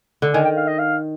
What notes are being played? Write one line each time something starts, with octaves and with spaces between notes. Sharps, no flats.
D3
D#3 G#5
G5
F5
D#5
F5